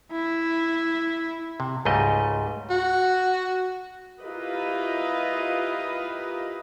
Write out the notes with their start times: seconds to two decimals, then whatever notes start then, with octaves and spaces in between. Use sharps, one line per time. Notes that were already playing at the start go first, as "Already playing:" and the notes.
0.12 E4
1.60 C3
1.85 C#2 G#2 G3 A3 D#5
2.70 F#4
4.21 E4 F4 G4 A#4 B4 D#5